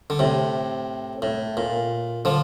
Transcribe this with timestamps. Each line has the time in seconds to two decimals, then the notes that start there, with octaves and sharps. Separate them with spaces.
0.10 D3
0.19 A2 C3
1.22 A2
1.57 A#2
2.25 D3 F3